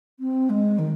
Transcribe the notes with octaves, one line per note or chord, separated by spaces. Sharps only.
C4
G#3
D#3